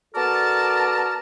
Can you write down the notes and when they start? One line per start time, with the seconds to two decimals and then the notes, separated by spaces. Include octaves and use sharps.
0.14 B3 F#4 A4 A#4 D5 A5